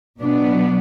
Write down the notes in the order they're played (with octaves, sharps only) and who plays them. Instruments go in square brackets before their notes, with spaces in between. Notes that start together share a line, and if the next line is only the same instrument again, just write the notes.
[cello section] B2 F#3 B3 D4